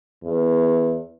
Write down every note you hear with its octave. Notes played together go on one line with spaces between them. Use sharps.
E2